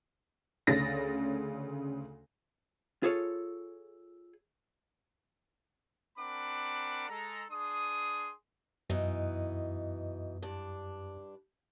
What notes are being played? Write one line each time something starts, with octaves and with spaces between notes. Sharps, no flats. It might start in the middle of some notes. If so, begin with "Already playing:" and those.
D2 C#3 A6 A#6
F4 G#4 A4 C#5
C4 D4 A#4 F#5 B5 D6
G#3 A4 A#5
D4 G#4 C6 D#6
F#2 B2 E3 D#4
G2 D4